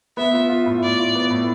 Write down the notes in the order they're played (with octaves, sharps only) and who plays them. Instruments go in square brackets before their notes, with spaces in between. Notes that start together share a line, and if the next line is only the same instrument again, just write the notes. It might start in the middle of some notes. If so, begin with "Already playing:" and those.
[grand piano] B3 [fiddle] E5
[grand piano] F4
F4
A2
[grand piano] A2 [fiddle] D5
[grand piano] F4
B3
A2